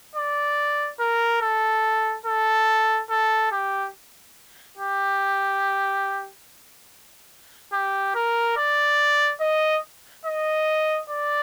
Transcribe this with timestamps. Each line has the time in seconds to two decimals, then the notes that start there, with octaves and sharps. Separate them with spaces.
0.15 D5
1.00 A#4
1.42 A4
2.26 A4
3.10 A4
3.52 G4
4.78 G4
7.73 G4
8.15 A#4
8.58 D5
9.41 D#5
10.26 D#5
11.10 D5